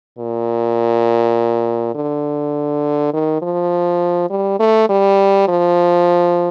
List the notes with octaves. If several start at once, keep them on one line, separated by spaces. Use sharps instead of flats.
A#2
D3
D#3
F3
G3
A3
G3
F3